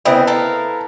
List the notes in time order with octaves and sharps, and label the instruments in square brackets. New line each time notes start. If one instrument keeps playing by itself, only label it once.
[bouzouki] C#3 C4 D#5 [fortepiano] B3 E4
[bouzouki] A4 A#4 F5